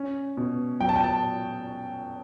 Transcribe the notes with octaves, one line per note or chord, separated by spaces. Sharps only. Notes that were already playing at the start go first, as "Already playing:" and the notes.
Already playing: C#4
B2
F#3 G5
A5
G5
A5